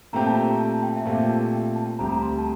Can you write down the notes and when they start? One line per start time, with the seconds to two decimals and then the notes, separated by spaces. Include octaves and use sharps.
0.13 A#2 A3 C4 G4 A#5
0.27 A5
0.36 A#5
0.60 A5
0.74 A5
0.83 G5
0.96 E5
1.05 A#2 A3 C4 G4 F5
1.29 A5
1.53 G5
1.76 A5
1.99 D2 D3 G3 C4 G4 A#5
2.12 A#5
2.23 C6
2.38 A5